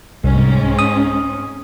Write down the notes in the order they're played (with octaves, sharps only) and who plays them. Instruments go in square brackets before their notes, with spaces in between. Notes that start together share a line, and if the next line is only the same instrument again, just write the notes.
[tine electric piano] C2 [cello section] G#2 C4 C#4
[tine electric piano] D#6